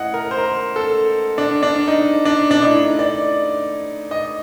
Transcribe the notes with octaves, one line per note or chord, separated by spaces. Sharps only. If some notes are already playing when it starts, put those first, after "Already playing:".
Already playing: A2 D#5 F#5
A#4
C5
A#4
A4
D4
D4
D#4
D4
D4
A2 D#4
D5
D#5